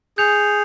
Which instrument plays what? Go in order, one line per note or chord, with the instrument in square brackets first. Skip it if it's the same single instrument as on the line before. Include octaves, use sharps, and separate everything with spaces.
[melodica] G#4 [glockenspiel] G6 C#7 F7